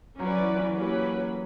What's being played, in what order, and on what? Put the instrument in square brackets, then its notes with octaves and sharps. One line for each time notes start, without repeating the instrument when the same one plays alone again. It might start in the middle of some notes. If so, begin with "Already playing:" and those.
[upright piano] F#3 [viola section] C#4 F#4 B4 D5
[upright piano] E3
E3
[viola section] F#3 A#3 C#4 G4 B4